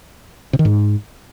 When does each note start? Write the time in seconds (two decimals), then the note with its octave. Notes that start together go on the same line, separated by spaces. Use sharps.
0.53 C3
0.59 D#3
0.65 G#2